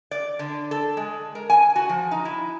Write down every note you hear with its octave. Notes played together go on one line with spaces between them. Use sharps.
D5
D3
A4
G#3
A#4
G#5
F#4
F3
D#4
E4